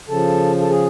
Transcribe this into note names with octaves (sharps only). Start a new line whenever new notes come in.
C#3 F3 A4
A4
G#4